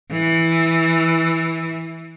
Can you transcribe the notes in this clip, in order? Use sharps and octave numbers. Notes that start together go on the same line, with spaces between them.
E3